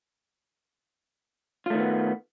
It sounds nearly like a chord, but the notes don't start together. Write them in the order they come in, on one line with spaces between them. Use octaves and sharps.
F4 A3 D#3 B3